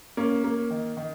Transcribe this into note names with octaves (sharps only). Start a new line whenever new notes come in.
A#3 C#4
A#3
D#3
D#3